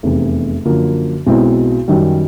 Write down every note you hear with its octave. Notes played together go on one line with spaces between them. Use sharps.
F1 E2 C3
F#2 D3 F3 A#3
B1 B2 G#3 C4 E4
F#2 D#3 G3